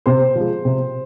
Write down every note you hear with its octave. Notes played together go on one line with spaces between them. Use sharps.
C3 C5
F3 G#3
C3